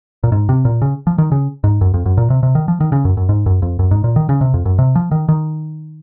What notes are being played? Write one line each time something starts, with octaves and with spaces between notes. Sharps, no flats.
A#2
G#2
C3
A#2
C#3
F3
D#3
C#3
G#2
F#2
F2
F#2
A#2
C3
C3
D#3
F3
D#3
C#3
F#2
F#2
G#2
F#2
F2
F#2
G#2
A#2
D#3
C#3
C3
F2
F#2
C3
F3
D#3
D#3